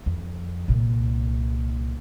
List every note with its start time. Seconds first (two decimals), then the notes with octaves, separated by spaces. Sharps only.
0.06 F2
0.68 C2 A#2